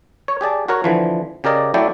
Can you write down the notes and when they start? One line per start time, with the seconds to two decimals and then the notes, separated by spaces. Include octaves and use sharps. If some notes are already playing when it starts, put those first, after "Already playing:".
0.28 C#5
0.41 G4 G#4 D5 A5
0.68 F#4 A#4 C#5
0.84 D3 E3 F3
1.44 C#3 G4 A#4 D5 D#5
1.74 F#3 A3 E4 D5 G5